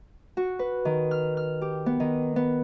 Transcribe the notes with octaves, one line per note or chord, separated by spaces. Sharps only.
F#4
B4
D#3
F6
F6
G4
B3
D#3
B3